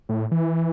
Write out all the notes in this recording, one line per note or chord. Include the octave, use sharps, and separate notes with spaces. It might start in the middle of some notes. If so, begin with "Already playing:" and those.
A2
E3